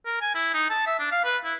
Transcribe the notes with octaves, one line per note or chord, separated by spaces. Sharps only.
A#4
G#5
E4
D#4
A5
E5
D4
F5
B4
E4